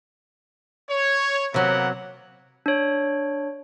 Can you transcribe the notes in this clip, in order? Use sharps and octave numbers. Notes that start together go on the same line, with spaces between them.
C#5
C3 F#3 A#3 B3 F#5
D4 C#5